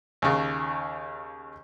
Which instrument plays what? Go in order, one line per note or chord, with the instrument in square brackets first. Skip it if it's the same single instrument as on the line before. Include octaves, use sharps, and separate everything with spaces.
[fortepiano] D#2 C#3